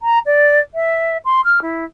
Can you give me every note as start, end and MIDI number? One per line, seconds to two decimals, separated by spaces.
0.01 0.19 82
0.26 0.60 74
0.75 1.17 76
1.25 1.41 84
1.45 1.60 89
1.62 1.85 64